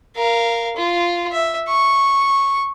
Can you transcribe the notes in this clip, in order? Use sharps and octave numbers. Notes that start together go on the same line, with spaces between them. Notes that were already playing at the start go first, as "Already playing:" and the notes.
A#4 F5
F4
E5
C#6